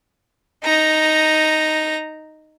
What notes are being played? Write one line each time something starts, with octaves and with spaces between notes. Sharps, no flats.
D#4 A#5